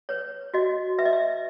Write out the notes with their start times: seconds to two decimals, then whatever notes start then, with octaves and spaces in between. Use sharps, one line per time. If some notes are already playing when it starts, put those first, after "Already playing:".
0.09 B4 C#5
0.54 F#4 D#5
0.99 B4 E5
1.05 D#5
1.13 E5